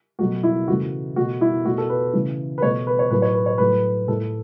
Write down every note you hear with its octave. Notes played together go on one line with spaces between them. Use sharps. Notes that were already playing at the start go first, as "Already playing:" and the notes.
B2 F#3 A3 F#4
E4
C#3 E3 A3 F#4
B2 A3 F#4
E4
B2 A3 F#4
A4
B4
C#3 E3 A3
B4
B2 A3 C#5
B4
C#5
A2 F#3 A3 B4
C#5
B4
C#5
A2 F#3 A3 B4
A2 A3 A4